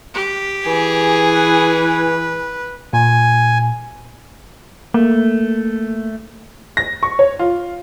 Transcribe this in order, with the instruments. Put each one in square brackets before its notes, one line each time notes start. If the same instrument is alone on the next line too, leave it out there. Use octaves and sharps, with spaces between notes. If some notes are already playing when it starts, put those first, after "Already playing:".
[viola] G4
[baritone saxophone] E3 [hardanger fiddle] G#4
[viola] B4
[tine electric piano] A#2 [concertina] G#5
[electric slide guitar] A3 [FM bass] A#3
[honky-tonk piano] A#6
C#6
C#5
F4